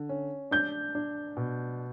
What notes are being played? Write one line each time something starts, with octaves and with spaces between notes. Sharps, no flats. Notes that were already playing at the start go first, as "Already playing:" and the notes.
Already playing: D3
C#4
D4 G6
D4
B2